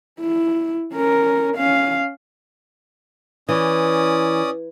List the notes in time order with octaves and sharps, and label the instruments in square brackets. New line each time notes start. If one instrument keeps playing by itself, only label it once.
[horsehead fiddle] E4
C#4 A#4
C#4 F5
[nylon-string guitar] E3 [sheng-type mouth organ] C#4 D5 D#6